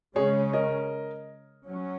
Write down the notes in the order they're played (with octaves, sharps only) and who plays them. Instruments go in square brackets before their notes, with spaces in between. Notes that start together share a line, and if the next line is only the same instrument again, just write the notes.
[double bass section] C#3 G#3 C#4 [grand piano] G#4 C#5
[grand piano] A#4 D#5
[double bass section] F#3 C#4